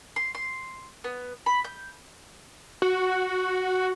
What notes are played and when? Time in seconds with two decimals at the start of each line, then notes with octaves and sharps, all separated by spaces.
0.16 C6
0.35 C6
1.04 B3
1.46 B5
1.64 G6
2.82 F#4